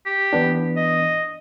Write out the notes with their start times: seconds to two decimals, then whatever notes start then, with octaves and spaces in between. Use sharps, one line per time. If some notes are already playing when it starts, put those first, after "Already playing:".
0.06 G4
0.33 E3 B3 D4
0.77 D#5